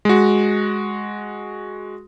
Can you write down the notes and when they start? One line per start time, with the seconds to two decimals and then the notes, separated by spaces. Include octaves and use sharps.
0.05 G#3 F#4